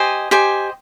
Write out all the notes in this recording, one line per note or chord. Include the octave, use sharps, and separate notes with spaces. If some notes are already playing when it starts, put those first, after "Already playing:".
Already playing: G4 C5 D#5 G#5
G4 C5 D#5 G#5